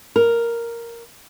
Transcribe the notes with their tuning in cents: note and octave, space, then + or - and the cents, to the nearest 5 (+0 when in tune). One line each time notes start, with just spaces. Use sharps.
A#4 +0